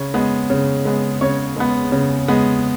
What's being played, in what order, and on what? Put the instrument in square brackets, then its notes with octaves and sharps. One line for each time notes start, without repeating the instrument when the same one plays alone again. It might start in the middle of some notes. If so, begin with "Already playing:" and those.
Already playing: [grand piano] C#3 C#5
G#3 B3
C#3
G#3 B3
C#3 C#5
G#3 B3
C#3
G#3 B3